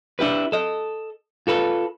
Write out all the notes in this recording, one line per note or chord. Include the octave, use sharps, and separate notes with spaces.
D4 E4 G4 B4
A4 D#5
F4 A4 B4